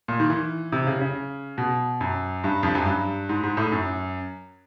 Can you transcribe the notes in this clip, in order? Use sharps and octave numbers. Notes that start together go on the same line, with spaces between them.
A#2
D#3
E3
C3
C#3
C#3
B2
F#2
G2
F2
F#2
G2
G#2
G#2
A2
F#2